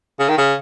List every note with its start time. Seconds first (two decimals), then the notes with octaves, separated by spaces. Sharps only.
0.19 C#3
0.29 D#3
0.38 C#3